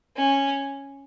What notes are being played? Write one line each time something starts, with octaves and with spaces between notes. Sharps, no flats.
C#4